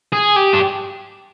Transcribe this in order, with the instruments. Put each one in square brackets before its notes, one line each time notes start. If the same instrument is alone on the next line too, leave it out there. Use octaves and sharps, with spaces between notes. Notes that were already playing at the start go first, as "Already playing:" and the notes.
[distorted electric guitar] G#4
G4
D4